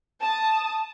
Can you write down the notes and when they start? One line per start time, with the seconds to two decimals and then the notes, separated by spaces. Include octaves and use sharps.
0.21 A5 D#6